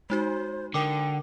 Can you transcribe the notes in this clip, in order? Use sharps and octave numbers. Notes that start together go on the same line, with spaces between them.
G#3 D#4 F#4 C5
D3 A#4 G5 D6